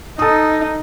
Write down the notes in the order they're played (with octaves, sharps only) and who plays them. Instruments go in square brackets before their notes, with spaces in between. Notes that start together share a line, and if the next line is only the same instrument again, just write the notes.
[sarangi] D#4 [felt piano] A4 D#6